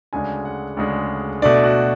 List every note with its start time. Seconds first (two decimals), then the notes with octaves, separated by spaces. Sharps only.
0.13 D2 C#3 G#3 D4 G#5
0.45 F#5
0.77 D2 C#3 G#3 D4
1.42 B2 A3 D4 D5
1.64 F#4